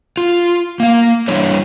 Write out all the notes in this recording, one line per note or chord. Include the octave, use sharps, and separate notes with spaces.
F4
A#3 F5
E3 G3 D4 E4 C#5